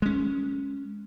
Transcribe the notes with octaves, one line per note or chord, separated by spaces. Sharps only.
G#3 C#4